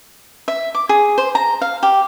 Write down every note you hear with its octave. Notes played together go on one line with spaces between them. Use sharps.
E5
D6
G#4
C5
A#5
F5
G4